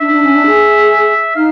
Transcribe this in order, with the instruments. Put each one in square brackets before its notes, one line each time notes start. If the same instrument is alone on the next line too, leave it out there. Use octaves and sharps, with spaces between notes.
[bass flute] D4 [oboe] E5
[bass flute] D4
C#4
D4
G#4
[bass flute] D#4 [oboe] F5